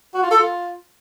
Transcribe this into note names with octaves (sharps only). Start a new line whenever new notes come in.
F#4
F4
A4
F4